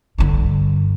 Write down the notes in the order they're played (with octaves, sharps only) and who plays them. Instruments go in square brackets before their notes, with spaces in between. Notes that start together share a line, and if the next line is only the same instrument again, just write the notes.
[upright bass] G2 D3